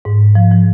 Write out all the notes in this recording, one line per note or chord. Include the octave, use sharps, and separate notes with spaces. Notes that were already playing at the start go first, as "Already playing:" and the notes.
G#2
F3
F3